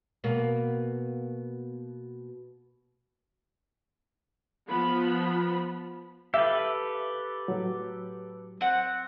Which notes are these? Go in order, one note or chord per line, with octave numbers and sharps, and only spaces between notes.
B2 A#3
F3 B3 B5
G4 A4 B4 E5 F5 E6
A2 F#3
C4 F#5